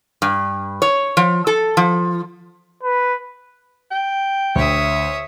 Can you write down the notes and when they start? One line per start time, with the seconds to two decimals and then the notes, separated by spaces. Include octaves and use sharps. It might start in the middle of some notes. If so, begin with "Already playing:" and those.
0.22 G2
0.82 C#5
1.17 F3
1.47 A4
1.77 F3
2.83 B4
3.91 G5
4.55 D2 C#5 E5 D#6